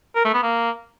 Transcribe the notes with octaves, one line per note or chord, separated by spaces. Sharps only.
A#4
A3
B3
A#3